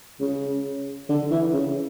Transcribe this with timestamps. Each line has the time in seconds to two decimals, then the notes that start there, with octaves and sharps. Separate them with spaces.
0.20 C#3
1.09 D3
1.31 E3
1.53 C#3